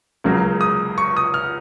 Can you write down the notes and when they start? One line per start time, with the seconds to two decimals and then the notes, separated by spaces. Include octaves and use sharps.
0.24 C#2 C#3 F#3 A#3
0.61 D#6
0.98 C#6
1.17 D#6
1.34 F6